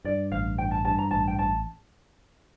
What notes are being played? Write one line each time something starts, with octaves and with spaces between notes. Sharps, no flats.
G2 D5
A1 F5
G2 G5
A5
G2 A5
A#5
A1 A5
G5
A1 A5